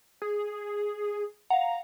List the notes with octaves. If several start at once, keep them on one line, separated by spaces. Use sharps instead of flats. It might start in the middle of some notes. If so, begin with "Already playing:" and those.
G#4
F5 F#5 A#5